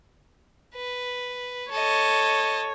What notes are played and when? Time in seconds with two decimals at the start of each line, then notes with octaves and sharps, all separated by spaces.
0.75 B4
1.72 A4 C#5 D#5